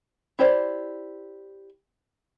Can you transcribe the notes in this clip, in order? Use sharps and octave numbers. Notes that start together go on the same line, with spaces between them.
E4 G4 C5 D5